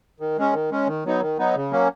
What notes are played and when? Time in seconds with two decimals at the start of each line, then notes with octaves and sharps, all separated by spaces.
0.20 D#3
0.37 G#3 C#4
0.53 D#3
0.71 G#3 C#4
0.87 D#3
1.05 F#3 B3 D#4
1.21 D#3
1.38 F#3 B3 D#4
1.55 C#3
1.71 F#3 A#3 C#4